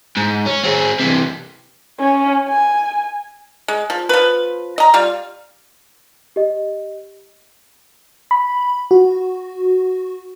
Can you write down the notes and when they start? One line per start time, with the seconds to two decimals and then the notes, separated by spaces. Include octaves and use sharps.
0.17 G#2
0.46 C#4
0.63 C4 G#4
0.99 C3 E3
2.00 C#4
2.49 G#5
3.68 G#3
3.90 F3
4.09 F3 B4
4.78 D#5 A#5
4.94 G3 F4
6.36 G4 D#5
8.31 B5
8.91 F#4